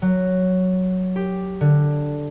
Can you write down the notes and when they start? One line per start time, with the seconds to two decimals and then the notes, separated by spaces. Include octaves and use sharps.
0.02 F#3
1.16 G4
1.61 D3